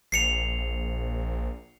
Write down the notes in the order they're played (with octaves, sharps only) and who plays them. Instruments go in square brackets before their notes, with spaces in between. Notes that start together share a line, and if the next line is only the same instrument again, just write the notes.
[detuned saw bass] A#1 [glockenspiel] C7 C#7 F7